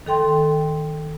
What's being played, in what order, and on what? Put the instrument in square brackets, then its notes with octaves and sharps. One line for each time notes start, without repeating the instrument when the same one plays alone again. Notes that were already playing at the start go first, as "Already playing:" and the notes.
[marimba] D#3 A4 G5 C6